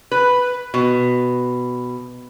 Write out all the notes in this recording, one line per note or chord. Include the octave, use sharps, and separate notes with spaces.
B4
B2